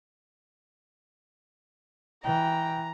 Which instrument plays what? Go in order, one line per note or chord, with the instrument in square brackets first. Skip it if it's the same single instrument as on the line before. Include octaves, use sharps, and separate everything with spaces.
[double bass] E3 [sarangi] G5 [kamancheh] A#5